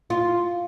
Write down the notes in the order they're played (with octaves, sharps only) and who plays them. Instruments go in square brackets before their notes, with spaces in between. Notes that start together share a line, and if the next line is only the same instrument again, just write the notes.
[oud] F4